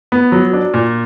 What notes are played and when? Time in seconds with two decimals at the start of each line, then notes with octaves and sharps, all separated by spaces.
0.12 B3
0.32 F#3
0.53 D4
0.74 A#2